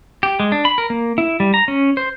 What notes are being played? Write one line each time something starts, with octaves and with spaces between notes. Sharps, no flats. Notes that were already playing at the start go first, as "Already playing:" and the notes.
G4
G#3
D4
B5
A#4
A#3
E4
G3
A#5
C#4
C5